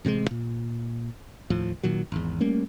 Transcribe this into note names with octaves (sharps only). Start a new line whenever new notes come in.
A1 C3 D#3 G#3
A#2
D#2 A2 F3
A#2 D#3 F#3
G#1 E2
G3 A3 A#3 C#4